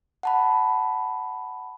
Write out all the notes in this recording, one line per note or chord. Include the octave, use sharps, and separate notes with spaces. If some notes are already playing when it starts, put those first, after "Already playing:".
F#5 A5 B5